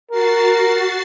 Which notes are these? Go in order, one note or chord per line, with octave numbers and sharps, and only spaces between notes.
F#4 A#4 A6 C7